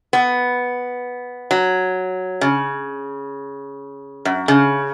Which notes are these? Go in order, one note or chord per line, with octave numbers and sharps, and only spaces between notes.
B3
F#3
C#3
F#2
C#3